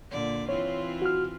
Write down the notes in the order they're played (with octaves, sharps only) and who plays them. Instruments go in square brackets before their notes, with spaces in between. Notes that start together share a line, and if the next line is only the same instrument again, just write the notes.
[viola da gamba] A#2 D3 D5
[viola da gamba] E3 C4 F4 [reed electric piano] C#5
[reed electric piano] F#4 F6